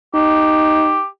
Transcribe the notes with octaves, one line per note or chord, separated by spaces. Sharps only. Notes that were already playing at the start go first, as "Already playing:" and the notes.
D#4 G4